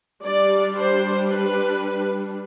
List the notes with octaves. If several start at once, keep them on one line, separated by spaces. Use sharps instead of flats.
G3 D4 D5
C5
B4